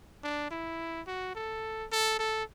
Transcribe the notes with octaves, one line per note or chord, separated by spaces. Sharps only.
D4
E4
F#4
A4
A4
A4